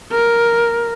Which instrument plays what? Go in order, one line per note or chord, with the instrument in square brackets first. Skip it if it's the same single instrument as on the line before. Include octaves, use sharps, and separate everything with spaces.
[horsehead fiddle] A#4